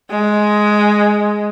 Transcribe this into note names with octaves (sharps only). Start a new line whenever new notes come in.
G#3